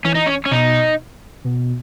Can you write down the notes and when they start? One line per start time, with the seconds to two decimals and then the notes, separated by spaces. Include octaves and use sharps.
0.04 E3 C#4
0.15 D#4
0.26 C#4
0.46 C#4
0.51 B2 D#4
1.44 B2